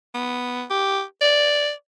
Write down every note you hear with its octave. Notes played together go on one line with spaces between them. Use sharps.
B3
G4
D5